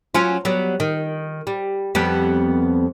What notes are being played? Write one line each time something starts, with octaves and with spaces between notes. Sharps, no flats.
F#3 C#4 F4
F#3 G3 B3
D#3
G3
F2 G3 B3